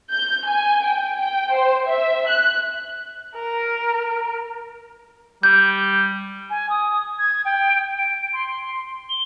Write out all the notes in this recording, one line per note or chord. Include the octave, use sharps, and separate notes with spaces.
G6
G#5
G5
G5
C5
E5
F#6
A#4
G3 G6
G#5
D#6
G#6
G5
D7
C6
G7